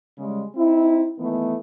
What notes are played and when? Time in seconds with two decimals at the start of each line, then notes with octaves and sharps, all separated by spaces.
0.18 C#3 G3 G#3
0.56 C4 D#4 E4
1.18 D#3 E3 A3 B3